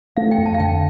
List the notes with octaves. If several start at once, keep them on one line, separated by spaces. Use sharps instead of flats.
A3 F5
G5
F2
A5
F5
D3 G5